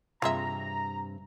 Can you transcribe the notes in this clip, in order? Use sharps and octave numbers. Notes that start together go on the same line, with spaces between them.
G2 C3 F4 G#4 E5 A#5